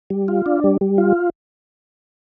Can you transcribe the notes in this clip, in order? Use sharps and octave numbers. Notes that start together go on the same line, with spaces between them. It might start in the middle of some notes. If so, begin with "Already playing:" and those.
G3
F4
D4
G3
G3
F4